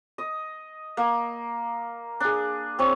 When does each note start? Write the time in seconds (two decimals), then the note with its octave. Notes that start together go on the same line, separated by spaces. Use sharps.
0.18 D#5
0.97 A#3
2.20 D4 G#4
2.79 C4 C#5